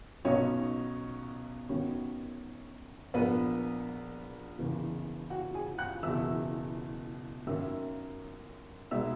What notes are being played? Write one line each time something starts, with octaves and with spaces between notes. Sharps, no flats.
B1 B2 F#3 B3 C#4 D#4 C#5
F#2 D#3 F#3 B3 C#4 C#5
A#1 A#2 A#3 B3 B4
F#1 E2 C#3 E3 B3
F#4 F#5
G#4 G#5
F#5 F#6
F#1 E2 B2 E5 E6
F#2 D#3 A#3 C#4 E5 E6
B2 G#3 B3 D#4 E5 E6